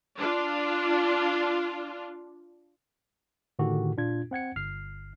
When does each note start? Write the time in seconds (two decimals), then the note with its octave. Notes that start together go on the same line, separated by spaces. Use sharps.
0.18 D4 F4
3.59 A2 D3 D#3 F#4 G4 A4
3.97 A#2 D4 F4 G#6
4.31 C4 F#5 G#6 C#7
4.56 G1 F6 C7